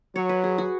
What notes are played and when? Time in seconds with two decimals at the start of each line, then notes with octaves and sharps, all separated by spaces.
0.16 F#3 C#5
0.29 B4
0.44 G#4
0.58 F#4